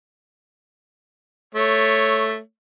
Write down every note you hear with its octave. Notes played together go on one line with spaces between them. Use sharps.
A3 C#5